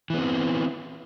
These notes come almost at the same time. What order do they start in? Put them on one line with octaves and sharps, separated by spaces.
E3 B3 C4